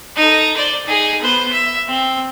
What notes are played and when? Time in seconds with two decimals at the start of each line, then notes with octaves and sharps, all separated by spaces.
0.16 D#4 A4
0.56 C5 D5
0.85 D#4 G#4
1.22 B3 C5
1.53 E5
1.88 C4